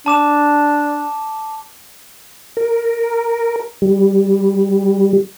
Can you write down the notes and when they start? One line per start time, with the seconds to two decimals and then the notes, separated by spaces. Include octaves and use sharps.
0.06 D4 A5 D6 E7
2.57 A#4
3.82 G3